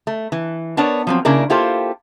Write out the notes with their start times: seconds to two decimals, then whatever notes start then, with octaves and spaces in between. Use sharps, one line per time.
0.07 A3
0.32 E3
0.77 B3 D4 A#4 C#5 D5 A5
1.07 F3 F#3 C4
1.25 C#3 A#3 D4 E4 A#4
1.50 A#3 E4 F4 G4 A4 C5